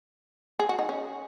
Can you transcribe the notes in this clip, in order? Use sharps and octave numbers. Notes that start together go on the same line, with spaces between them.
G#4
F#4
D#4
C#4